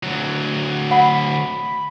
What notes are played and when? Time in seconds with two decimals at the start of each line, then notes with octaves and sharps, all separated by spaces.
0.03 D2 F#3
0.91 F#5 B5